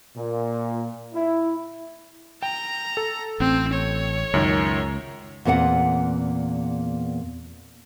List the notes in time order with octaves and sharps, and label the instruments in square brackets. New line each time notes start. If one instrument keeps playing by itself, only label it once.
[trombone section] A#2
E4
[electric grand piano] G5 [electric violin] A#5
[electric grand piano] A4
[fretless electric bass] A1 [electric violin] C4
[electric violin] C#5
[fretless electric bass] C#2 [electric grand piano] F#2 D#3
[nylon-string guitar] E2 A#2 B3 C4 F#5